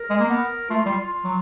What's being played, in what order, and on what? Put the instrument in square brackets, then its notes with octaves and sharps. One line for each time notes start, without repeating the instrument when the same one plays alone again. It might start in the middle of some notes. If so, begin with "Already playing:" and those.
Already playing: [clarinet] A#4
[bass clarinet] G#3
A#3
B3
[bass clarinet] A3 [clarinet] F4
[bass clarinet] G3 [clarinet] F4
[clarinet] F4
[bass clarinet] F#3